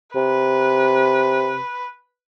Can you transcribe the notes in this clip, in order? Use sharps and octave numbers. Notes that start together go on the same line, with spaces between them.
C3 B4